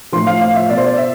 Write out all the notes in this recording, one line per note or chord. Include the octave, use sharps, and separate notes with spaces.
A2 F3 C6
F5
F5
E5
B2 D5
C5
D5
E5